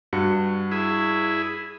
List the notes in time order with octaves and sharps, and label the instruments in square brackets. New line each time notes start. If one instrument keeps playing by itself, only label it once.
[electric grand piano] G2 F#4 C#7
[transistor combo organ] E4 G#4